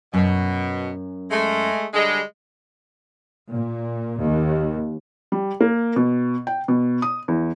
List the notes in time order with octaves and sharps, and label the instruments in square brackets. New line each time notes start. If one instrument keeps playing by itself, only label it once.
[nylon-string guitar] F#2 [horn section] B2
[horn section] G#3 A3
D3 G3 G#3
[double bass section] A#2
D#2
[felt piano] G3
A#3
B2
G5
B2
D#6
E2